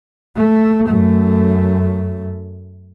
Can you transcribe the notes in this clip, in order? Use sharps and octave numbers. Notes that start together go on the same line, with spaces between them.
A3
F#2 A3